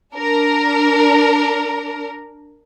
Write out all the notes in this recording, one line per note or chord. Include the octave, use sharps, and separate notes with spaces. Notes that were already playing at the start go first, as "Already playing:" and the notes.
D4 A#4